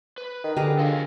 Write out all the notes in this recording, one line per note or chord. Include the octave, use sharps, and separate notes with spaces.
B4
D#3
D3 G4 G#4 A#4
F4 A4 D#5 F5